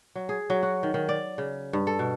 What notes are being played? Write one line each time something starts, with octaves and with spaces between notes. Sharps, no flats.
F#3
G#4
F#3
F#4
D#3
D#3
D5
C#3
G2
A4
B2